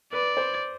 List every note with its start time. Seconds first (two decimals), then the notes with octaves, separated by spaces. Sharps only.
0.13 B4 D5
0.37 C5